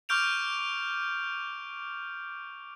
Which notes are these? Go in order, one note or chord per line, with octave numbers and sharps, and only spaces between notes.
C#6 D6 F6 G6 D7 F7